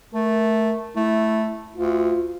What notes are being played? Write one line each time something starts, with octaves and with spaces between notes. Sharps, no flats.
A3 A#4
A3 E4
D2 F4